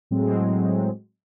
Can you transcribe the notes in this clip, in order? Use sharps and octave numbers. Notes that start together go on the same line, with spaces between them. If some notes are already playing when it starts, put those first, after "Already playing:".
A2 F#3 G#3 C4